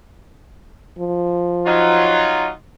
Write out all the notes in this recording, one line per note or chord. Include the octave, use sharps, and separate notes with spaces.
F3
F#3 D#4 F4